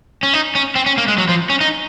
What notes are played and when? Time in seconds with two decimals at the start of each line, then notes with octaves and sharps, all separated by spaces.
0.23 C#4
0.33 D#4
0.55 C#4
0.75 C4
0.86 C#4
0.98 A#3
1.08 G#3
1.18 F#3
1.29 F3
1.50 C#4
1.61 D#4